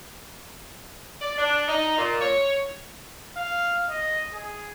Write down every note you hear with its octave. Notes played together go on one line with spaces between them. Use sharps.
D5
D4
D#4
A#2
C#5
F5
D#5
G#4